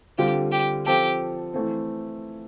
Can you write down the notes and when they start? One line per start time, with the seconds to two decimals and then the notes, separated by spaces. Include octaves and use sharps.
0.18 D3 G3 C4 F4 G4
0.52 G4
0.86 F3 C4 F4 G4 A4
1.54 E3 A3 C4